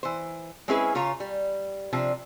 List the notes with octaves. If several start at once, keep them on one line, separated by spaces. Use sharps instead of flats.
E3 C5
G#3 C4 C#4 E4 G#4 B4
C#3 F4 C#5 A#5
G3
C3 F3 D4